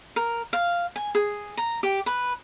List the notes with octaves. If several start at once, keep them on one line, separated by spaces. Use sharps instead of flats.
A#4
F5
G#5
G#4
A#5
G4
B4